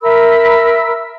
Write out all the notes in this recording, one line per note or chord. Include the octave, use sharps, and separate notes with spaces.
A#4 E5 B5 E6